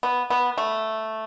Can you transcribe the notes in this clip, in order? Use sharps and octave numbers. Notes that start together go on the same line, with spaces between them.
B3
B3
A3